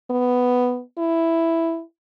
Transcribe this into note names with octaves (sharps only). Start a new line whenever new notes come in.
B3
E4